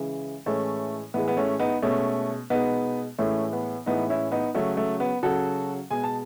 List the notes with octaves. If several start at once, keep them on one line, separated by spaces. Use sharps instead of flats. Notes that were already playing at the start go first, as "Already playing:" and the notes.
Already playing: C#3 E3 G#3
A2 E3 G#3 A3 C#4
A2 E3 G#3 B3
B3
A3 C#4
B3 D#4
B2 G#3 A3 C#4
B2 G#3 B3 D#4
A2 E3 G#3 A3 C#4
B3
A2 E3 G#3 B3 D#4
C#4 E4
B3 D#4
C#3 F#3 A3 C#4
A3
B3
C#3 F#3 F#4 A4
B2 G#3 G#5
A5